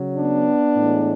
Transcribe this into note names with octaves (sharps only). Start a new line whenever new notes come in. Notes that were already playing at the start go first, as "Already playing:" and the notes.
Already playing: C#3 F#3
B3 D4
A2 E3 G#3